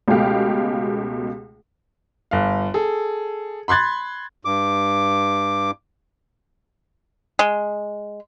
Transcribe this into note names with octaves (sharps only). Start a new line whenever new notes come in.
C#2 B2 G#3 A3 G4 F5
G1 F5
G#4 A4
B5 C6 F#6 G#6 A6
G2 D6
G#3